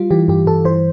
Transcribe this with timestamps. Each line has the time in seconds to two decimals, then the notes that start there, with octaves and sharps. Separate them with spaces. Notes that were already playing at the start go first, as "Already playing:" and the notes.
Already playing: G3 F4
0.11 E3 G4
0.28 G2 G4
0.46 G2 A4
0.65 E3 C5